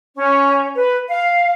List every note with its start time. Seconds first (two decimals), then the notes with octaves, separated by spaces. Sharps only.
0.16 C#4
0.75 B4
1.09 F5